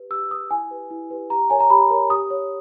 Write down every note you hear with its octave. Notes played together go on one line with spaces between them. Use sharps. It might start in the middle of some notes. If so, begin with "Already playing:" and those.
Already playing: G4 B4
G4 E6
B4 D#6
E4 G#5
G4 B4
E4
G4 B4
G4 A#5
A#4 C#5 G#5
A#5
G4 B5
A#4 C#5
G4 D#6
C#5